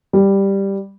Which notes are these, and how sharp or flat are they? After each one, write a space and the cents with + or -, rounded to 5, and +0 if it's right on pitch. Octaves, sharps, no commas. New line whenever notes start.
G3 +5